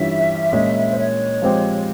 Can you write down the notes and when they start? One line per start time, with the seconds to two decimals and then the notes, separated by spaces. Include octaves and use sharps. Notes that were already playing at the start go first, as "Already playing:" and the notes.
Already playing: G2 E3 G3 C#4 F4 E5
0.52 A#2 G#3 C#4
0.90 C5
0.97 C#5
1.42 F3 G#3 C4 G4